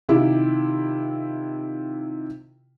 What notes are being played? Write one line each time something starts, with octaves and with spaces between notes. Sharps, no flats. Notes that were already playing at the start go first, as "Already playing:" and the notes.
C3 D#3 E4 F4 G4